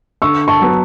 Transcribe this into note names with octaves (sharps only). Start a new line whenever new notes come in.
D3 C#6 E6
A5 C#6
F#3 B3